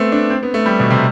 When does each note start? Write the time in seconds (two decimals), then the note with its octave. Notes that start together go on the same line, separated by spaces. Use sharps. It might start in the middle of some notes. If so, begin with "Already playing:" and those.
Already playing: A3 B3 C4
0.12 D4
0.30 C4
0.43 B3
0.54 A3
0.66 G3
0.80 B2
0.90 C3